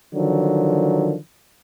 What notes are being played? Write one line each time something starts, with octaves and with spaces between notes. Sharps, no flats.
D3 D#3 F3 F#3